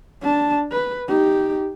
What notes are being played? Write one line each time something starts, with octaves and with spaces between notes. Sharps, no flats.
D4 A5
B4
D#4 G4